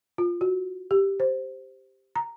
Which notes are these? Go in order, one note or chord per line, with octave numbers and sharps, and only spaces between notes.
F4
F#4
G4
C5
A#5